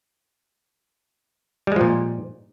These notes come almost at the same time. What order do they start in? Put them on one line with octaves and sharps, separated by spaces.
G3 G#3 F3 A#2